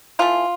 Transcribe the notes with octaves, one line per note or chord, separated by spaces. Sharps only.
E3 A3 F4